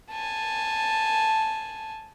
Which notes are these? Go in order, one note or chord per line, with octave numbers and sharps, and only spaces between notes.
G#5 A5